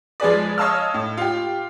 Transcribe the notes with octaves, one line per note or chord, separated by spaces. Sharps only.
F3 G#3 G#4 B4 D5
C#5 D#5 F5 A5 E6 F6
A2
F4 G4